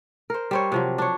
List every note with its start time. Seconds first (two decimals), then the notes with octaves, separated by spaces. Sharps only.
0.30 A#4 C5
0.51 G3 C5 C#5
0.72 C3 F3 F#3
0.98 D4 C#5